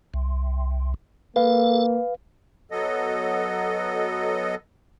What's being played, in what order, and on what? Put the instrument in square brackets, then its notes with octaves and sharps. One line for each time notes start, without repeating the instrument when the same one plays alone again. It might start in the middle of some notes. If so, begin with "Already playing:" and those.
[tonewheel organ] C2
[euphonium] A#3 [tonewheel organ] A4 [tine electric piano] B4 F5
[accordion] F#3 B3 A4 D#5